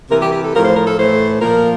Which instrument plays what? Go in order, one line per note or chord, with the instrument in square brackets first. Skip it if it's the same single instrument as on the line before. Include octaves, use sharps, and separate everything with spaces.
[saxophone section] C3 E3 A#4
G4
G4
A4
A2 F3 A#4
C5
A#4
A4
A2 E3 C5
A#2 F3 A#4